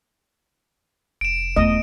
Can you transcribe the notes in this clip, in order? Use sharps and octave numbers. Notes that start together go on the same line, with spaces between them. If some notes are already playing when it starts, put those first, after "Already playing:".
F1 D7 E7
E2 A3 D#5